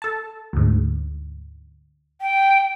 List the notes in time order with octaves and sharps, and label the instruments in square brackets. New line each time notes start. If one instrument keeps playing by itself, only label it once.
[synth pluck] A4 A5
D2 G#2
[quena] G5